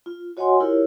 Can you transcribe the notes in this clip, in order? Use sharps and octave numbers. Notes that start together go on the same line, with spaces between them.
F4
F#4 C#5 D#5 F#5 G#5 C6
E4 F4 G4 A#4 C#5